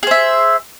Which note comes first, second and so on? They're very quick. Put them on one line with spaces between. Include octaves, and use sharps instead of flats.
G#4 C5 E5